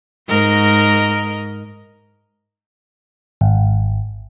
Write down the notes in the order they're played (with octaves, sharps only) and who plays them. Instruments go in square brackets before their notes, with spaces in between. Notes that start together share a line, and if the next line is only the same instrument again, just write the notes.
[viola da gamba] G#2 A#4 D#5
[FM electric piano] G#1